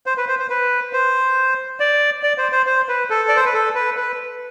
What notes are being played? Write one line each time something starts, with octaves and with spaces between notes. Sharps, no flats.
C5
B4
C5
C5
B4
C5
D5
D5
C5
C5
C5
B4
A4
D5
C5
B4
A4
B4
B4